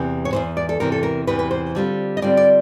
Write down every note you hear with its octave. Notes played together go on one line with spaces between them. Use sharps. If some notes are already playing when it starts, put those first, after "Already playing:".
Already playing: E2 C3 E3
C#5
E2 C3 E3 C5
D5
A4
E2 C3 E3 A#4
A4
A#4
E2 C3 E3 B4
B4
C5
D3 G3 C4 F4
D#5
D3 G3 C4 F4 D5
D5